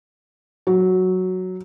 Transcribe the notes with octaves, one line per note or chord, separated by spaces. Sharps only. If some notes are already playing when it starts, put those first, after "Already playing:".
F#3